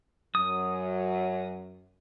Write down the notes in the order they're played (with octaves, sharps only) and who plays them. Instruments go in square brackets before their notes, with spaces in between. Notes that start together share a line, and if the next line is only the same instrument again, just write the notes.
[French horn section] F#2 F#3 [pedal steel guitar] D#6